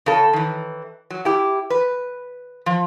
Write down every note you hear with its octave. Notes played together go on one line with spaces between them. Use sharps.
C#3 A4
D#3 E3
F#3
E4 G4
B4
F3